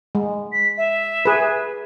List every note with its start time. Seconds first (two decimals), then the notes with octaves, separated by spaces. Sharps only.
0.15 G#3
0.52 B6
0.78 E5
1.25 G#4 B4